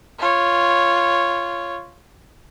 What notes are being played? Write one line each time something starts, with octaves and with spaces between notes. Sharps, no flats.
F4 C#5